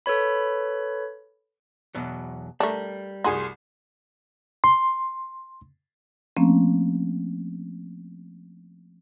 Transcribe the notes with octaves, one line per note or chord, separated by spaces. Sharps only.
A4 B4 C#5 B5
E2 B2 F#3
G3 A3 D4 A#4
C2 F#4 G#4 C6
C6
F3 A3 A#3 C4 C#4